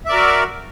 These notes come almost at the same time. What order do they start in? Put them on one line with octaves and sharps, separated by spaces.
E5 D5 A#4 F#4